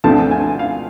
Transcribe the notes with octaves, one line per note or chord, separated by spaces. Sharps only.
D2 D3 F3 A3 C4 A5
G#5
F5